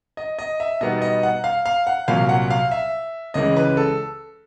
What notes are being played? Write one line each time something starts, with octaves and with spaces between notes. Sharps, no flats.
D#5
D#5
E5
B2 G3 B3 D#4 D#5
D#5
F#5
F5
F5
F#5
C2 A#2 F#3 F5
F#5
F5
E5
C#2 C#3 E3 G#3 D#5
B4
A4